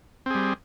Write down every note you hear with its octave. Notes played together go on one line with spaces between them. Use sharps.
G3 C4 G#4